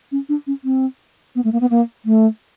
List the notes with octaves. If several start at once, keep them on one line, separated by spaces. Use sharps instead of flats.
C#4
D4
C#4
C4
B3
A3
A#3
B3
A#3
A3